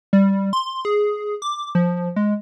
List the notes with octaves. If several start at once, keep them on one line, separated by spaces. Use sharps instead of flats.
G3
C6
G#4
D6
F3
G#3